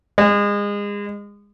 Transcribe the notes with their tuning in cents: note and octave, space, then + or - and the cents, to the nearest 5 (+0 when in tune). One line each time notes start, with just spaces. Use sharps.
G#3 -30